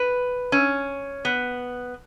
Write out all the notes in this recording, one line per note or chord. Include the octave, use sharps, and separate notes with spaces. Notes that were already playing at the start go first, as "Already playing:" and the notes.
Already playing: B4
C#4
B3